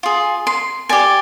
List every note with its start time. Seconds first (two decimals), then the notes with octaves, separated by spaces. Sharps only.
0.03 F4 G#4
0.47 C6
0.89 G4 D5 G#5